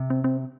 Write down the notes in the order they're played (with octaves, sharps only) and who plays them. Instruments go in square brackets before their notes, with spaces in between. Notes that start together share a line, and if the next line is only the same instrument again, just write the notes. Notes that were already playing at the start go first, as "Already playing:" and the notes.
Already playing: [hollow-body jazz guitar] C3
[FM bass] C4
C4